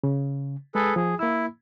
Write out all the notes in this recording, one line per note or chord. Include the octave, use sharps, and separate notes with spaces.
C#3
G#3 G#4 A4 B4
F3 G#4
A#3 E4 E6